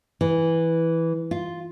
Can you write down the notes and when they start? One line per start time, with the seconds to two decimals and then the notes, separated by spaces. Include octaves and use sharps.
0.21 E3
1.31 F4